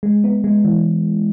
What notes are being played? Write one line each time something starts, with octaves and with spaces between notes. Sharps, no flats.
G#3
B3
G#3
E3